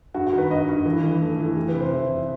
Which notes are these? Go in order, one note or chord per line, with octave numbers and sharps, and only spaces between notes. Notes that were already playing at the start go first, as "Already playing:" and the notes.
G2 F#4
F#4
D#3
B4
G2 D#5
G2
E3
E3
A3
E3
E3 G4
B4
C3
C5
E3 E5
E2